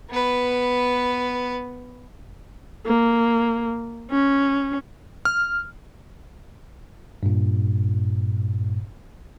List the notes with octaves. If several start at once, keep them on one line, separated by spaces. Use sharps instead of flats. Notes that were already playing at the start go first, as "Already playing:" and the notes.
B3 B4
A#3
C#4
F6
G2 A#2